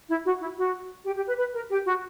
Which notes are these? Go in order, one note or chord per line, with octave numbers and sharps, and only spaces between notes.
E4
F#4
E4
F#4
G4
G4
B4
B4
A#4
G4
F#4